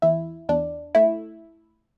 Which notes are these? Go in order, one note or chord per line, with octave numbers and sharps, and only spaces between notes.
E2 E4
E2 D4
A3 E4